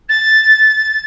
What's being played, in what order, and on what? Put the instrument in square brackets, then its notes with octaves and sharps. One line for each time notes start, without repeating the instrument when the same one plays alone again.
[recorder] A6